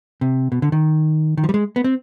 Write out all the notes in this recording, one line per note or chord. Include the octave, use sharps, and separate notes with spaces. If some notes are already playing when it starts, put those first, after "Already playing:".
C3
B2
D3
D#3
D#3
F3
G3
G#3
B3
C4